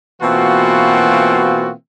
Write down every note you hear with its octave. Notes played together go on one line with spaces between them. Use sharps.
B2 E3 A#3 C4 F4 F#4